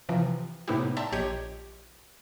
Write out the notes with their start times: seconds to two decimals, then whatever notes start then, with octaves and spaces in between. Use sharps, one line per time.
0.09 C3 E3 F3
0.68 A2 C3 B3 D#4 E4 G4
0.97 D5 E5 G5 A5 A#5 C6
1.12 A#1 G4 C#5 D#5 G6 G#6